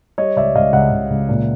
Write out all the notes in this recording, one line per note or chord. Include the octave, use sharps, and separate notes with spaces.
G3 C#5 D#5
C#2 D5 E5
C#2 D#5 F5
C#2 E5 F#5
C#2
C#2
A#2